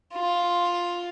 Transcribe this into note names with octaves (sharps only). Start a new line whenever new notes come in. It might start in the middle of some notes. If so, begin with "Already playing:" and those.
F4